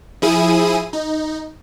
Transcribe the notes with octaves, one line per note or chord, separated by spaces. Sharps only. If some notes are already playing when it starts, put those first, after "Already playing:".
F3 E4 G#4 D#6 D#7
D#4